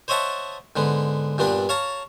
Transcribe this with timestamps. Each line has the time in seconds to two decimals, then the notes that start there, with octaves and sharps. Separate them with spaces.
0.08 C5 C#5 D#5 E5 F#5 A5
0.76 G#2 D3 B3
1.38 G2 A#2 B3 D4 D5
1.69 C#5 F5 A5 A#5